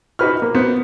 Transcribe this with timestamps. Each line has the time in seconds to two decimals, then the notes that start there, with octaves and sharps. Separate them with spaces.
0.19 D#4 F#4 B4 F6
0.42 A#3
0.55 B3 C5